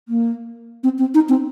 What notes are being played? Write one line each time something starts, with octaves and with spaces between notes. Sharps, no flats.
A#3
C4
C4
D#4
C4